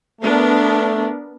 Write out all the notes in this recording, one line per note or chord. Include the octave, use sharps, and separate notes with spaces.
A3 B3 D4 A#4